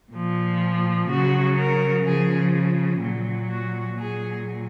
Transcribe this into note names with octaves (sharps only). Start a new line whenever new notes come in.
A#2 F3
C#3 F#3 F#4
A#4
C#3 F3 G#4
A#2 F#3
F#4
A#2 F#3 G#4